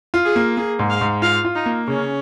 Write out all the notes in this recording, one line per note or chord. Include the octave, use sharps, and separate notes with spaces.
F4
G#4
A#3
A#3 G#4
G#2
F5
G#2
F4 F5
F4
D#4
A#3
C#3 C#4